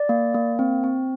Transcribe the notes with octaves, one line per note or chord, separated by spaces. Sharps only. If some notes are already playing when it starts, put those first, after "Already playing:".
Already playing: D5
A#3
A#3
C4
C4